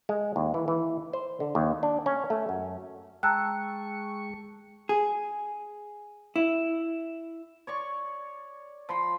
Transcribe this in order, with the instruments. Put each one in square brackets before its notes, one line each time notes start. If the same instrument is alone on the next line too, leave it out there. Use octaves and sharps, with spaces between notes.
[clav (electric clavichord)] G#3
D#2
E3
E3
C5
D3
D#2
D4
C#4
A3
F#2
[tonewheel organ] G#3 C#6 [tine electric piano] G5 A5 [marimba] A#5 E6 F#6
[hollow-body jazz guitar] G#4
E4
[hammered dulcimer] C#5 D5 C#6
F3 B5 C6